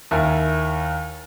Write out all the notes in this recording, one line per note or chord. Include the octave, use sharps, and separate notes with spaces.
D#2 E4 A#4 G#5